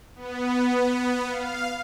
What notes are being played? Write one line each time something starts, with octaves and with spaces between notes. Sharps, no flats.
B3
F5